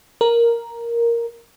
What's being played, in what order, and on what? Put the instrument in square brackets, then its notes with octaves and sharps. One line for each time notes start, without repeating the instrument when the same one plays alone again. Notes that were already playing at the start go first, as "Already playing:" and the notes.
[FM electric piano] A#4